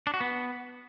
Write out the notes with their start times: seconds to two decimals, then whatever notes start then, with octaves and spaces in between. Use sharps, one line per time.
0.07 D4
0.14 F#4
0.21 B3